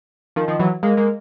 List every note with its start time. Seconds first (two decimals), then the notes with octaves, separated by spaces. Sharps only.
0.36 D#3 F3
0.48 D#3 F3
0.59 E3 F#3
0.83 G#3 A#3
0.97 G#3 A#3